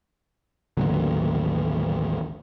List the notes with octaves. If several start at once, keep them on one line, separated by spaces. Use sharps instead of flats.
A1 D#2 D3 F#3